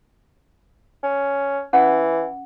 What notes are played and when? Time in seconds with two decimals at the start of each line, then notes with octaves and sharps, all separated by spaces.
1.03 C#4
1.73 E3 C#4 F#5 G#5